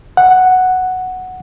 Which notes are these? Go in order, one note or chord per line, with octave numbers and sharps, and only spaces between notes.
F#5